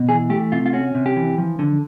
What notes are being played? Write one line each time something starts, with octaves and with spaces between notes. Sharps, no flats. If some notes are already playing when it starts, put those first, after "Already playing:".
Already playing: B2
E3 G#4
A3 G4
C3 F4
F4
C#4 F#4
C3
G4
E3
F3
D3